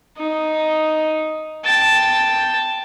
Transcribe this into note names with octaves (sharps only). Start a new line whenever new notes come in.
D#4
G5 A5